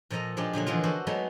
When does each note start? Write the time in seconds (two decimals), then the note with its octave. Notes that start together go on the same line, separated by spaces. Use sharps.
0.10 A#2 F3 A4 D#5 A#5
0.37 F3 G#3 D4 D#4 G4
0.53 A#2 D3 F#3 A#3
0.66 D3 E3 F3 G#3 F4
0.83 F#4 A4 C5 D5 D#5
1.07 F#3 G#3 A3 B3 D#4